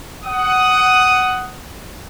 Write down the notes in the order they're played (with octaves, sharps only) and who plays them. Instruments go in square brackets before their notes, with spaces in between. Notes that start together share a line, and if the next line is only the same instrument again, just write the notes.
[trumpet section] F#5 D#6